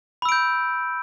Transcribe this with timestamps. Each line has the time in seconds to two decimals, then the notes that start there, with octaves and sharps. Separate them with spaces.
0.22 B5
0.25 E6
0.29 D7
0.32 G6